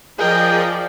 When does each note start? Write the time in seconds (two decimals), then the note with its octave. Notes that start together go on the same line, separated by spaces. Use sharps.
0.19 F3 G#4 A#4 D5 D#5 G5